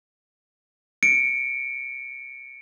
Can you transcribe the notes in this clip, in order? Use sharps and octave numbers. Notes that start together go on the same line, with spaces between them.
C#7 D7